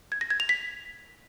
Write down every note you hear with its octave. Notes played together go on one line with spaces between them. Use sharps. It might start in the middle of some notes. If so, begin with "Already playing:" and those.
G#6
A#6
G#6
F7
B6